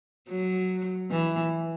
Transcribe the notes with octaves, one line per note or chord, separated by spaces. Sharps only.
F#3
E3